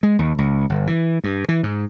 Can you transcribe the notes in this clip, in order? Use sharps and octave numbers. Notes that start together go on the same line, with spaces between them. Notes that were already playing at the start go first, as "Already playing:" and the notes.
G#3
D#2
C#2
G1
E3
G2
E3
G#2